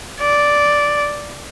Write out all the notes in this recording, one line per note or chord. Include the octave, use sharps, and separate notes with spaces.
D5